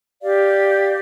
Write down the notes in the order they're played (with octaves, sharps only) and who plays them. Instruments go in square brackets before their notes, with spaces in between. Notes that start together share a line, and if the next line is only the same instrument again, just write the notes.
[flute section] G4 D5 F5